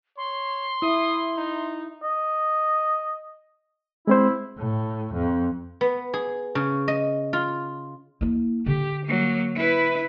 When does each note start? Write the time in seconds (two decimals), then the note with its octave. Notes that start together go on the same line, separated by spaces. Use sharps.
0.17 C#5 C6
0.82 E4 D#6
1.37 D#4
2.03 D#5
4.07 G#3 C4 E4 C5
4.58 A2
5.14 F2
5.81 B3
6.14 G#4
6.55 C#3
6.88 D#5
7.33 F4
8.21 A#3 E4
8.66 D3 G4
9.06 F#3 A#3
9.56 E4 B4